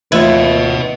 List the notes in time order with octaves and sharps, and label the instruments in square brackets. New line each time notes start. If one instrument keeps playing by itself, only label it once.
[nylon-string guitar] D#2 F4 [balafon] E3 A3 [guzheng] E4 [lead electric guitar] B4 D#5